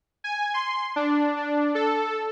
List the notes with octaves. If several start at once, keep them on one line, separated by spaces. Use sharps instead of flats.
G#5
C6
D4
D4
A4